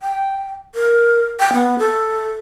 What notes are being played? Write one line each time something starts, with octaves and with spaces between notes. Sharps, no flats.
G5
A#4
G5
B3
A4